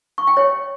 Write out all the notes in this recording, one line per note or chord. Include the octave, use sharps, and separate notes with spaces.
C#6
G5
C#5